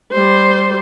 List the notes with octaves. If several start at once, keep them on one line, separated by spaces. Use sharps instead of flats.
G3 C5